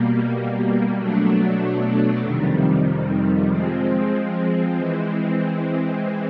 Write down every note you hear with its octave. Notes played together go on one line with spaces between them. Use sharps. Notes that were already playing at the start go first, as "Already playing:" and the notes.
Already playing: B2 G3 A#3
B2 F#3 A3 D4
F2 C3 D#3 G3
F3 G#3 C4
E3 G#3 C4